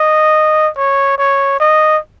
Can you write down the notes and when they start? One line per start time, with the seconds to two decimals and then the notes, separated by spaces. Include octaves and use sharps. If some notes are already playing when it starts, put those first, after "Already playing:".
Already playing: D#5
0.77 C#5
1.18 C#5
1.60 D#5